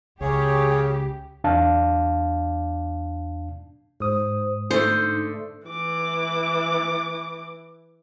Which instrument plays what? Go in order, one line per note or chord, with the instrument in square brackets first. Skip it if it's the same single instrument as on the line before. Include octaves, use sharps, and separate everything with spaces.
[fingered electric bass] C#2 [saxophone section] C#3 [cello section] G4 [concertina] G#4 C#5
[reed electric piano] E2 D4 F5 A5
[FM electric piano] G#2 D#6 [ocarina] C5
[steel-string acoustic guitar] D3 A3 [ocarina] D#4 [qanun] C5
[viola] E3 D6